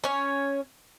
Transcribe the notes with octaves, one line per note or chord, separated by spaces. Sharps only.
C#4 C#5